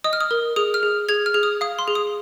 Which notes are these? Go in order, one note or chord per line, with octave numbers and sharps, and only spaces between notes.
D#5 D#6
F6
D#6
A#4
G#4 D#6
F6
G#4
G#4 G#6
F6
G#4
D#6
F5 D#6
C6
G#4
D#6